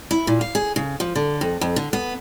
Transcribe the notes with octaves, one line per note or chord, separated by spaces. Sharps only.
E4
A#2
F5
G#4
C#3
F3
D3
F2
F2
D3
B3